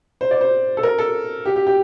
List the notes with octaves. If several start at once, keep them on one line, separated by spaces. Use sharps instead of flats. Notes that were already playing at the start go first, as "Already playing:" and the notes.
C5
D5
C5
A4
A#4
A4
G4
G4
G4